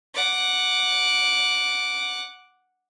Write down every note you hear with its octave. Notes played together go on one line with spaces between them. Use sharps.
F#5 D6